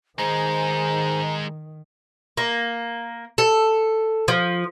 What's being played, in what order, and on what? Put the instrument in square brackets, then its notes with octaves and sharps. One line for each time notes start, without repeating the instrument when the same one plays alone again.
[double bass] D#3 [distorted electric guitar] G#3 D#4 [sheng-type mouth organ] G#4 C5 [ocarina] A#5
[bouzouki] A#3
A4
F3